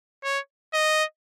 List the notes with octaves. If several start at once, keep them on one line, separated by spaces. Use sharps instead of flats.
C#5
D#5